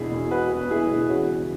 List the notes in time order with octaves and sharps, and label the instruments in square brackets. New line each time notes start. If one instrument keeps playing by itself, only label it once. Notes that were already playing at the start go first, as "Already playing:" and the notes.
Already playing: [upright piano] E1 E2 B2 E4 G#4
E1
B2 F#4 B4
E2
E1 E4 G#4
E1
E3 C#4 F#4
C#3